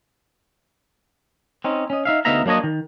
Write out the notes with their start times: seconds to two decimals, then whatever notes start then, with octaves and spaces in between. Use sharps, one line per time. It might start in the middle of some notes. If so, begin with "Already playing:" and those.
1.64 C4 C#4 D#4
1.90 C#4 D#5
2.05 D#4 E5 F5
2.25 D2 B3 D#4 E5 F5 A#5
2.46 F#3 A#3 D4 C#5 D#5
2.64 D#3